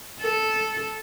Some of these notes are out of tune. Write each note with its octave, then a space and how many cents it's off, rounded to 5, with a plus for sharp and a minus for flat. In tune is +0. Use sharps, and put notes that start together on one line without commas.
A4 -10